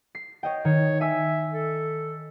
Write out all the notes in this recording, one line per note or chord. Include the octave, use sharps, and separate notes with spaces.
C7
C#5 D#5 G5
D#3 C#5
E5 G#5 E6
A4